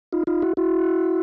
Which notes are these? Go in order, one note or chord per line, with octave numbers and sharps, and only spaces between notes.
D#4 F4
D#4 F4
E4 F#4
E4 F#4